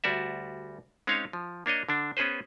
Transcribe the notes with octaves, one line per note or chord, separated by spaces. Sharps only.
D2 G3 F#4 D5 E5
G#3 C4 C#4 D#4 C#5 F5
F3
A#3 D4 C#5 D#5
D3 D4
B3 C#4 G#4 B4 C5